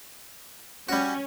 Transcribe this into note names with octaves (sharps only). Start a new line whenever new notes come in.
G3 C#4 F#4